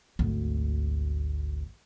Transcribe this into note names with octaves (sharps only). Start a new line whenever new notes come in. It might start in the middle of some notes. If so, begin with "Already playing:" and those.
G#1 D2